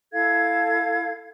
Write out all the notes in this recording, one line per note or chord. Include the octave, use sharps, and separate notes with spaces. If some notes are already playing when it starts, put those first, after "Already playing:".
E4 A4 F5 G#6